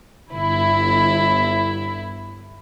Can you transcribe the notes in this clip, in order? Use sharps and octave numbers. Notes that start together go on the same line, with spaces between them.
G1 E4